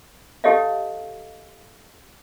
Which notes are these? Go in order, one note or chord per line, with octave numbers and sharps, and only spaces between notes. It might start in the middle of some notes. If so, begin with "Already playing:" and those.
D#4 G4 A4 C#5 D#5 F5